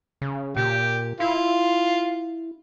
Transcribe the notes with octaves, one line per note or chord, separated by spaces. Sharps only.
C#3
A#2 G4
E4 F4